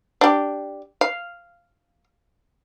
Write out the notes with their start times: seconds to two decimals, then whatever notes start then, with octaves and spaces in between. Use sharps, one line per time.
0.21 D4 G4
1.01 F5